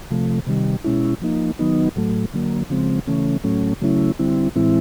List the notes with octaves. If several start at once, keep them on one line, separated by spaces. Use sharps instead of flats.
C3 F3 A3
C3 D#3 G3
B2 G#3 C#4 E4
F3 A#3 D#4
D#3 F#3 B3 D#4
A2 F#3 A3
D3 F#3 A#3
C#3 F3 G#3 C4
C#3 E3 A3 C#4
A2 F#3 A3 C#4
C#3 F#3 A3 C#4 E4
D3 G3 C4 E4
A2 E3 G#3 C4 E4